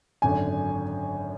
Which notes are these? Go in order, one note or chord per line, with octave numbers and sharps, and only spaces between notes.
G#1 F#2 D3 G#5